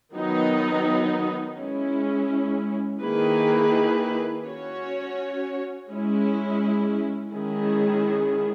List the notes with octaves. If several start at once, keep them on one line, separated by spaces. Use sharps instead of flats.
D#3 F#3 B3 D#4
G#3 C#4 E4
D#3 A#3 E4 G#4 B4
C#4 F#4 C#5
G#3 C#4 E4
D#3 G#3 C#4 E4 G#4